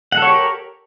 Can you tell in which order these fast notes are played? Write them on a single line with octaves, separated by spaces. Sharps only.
F#5 A4 C#5 G4 A#4